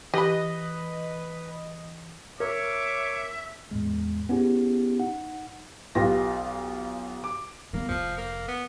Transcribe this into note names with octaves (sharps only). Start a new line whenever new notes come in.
E3 G4 B4 D#5 B5
A#4 C#5 E5 D6
E2 A2 G#3
B3 C#4 E4 G4 G#4
D#4 F#5
B1 F4 G4 B4 G5 A#6
D6
G3 A#3 B3
F1 F2 F3
A#3
B3